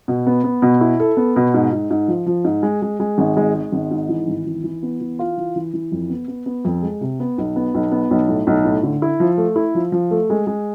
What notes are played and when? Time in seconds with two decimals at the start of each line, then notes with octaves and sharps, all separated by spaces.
0.08 B2
0.27 B3
0.44 B3
0.62 B2
0.81 E4
1.00 A4
1.17 B3
1.36 B2
1.54 G#2
1.73 G#2
1.90 G#2
2.08 F3
2.26 F3
2.44 G#2
2.63 G#3
2.82 G#3
3.00 G#3
3.18 G#1
3.37 G#3
3.55 G#3
3.72 G#1
3.91 G#2
4.09 E3
4.27 G#1
4.46 E3
4.64 E3
4.83 B3
5.01 E3
5.19 F4
5.37 E3
5.56 E3
5.74 E3
5.92 F2
6.10 B3
6.28 B3
6.46 B3
6.65 F2
6.82 G#3
7.01 C3
7.20 B3
7.38 B1
7.56 B3
7.74 B1
7.92 B3
8.11 B1
8.28 A2
8.47 B1
8.64 A2
8.83 D3
9.02 E4
9.20 F3
9.38 A3
9.56 E4
9.75 F3
9.92 F3
10.11 A3
10.30 G#3
10.47 G#3